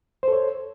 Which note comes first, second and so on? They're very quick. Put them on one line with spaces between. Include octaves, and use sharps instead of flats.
C5 A4 C#5